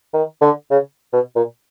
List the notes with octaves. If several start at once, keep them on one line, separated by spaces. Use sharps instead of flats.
D#3
D3
C#3
B2
A#2